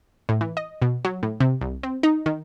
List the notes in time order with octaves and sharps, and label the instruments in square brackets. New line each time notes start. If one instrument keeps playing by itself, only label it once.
[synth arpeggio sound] A2
E3
D#5
B2
F#3
A2
C3
C2
C4
D#4
D#3